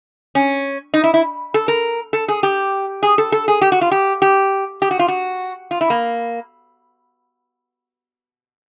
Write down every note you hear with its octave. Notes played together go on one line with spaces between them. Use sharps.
C#4
D#4
E4
E4
A4
A#4
A4
G#4
G4
G#4
A4
A4
G#4
G4
F#4
F4
G4
G4
G4
F#4
F4
F#4
F4
E4
A#3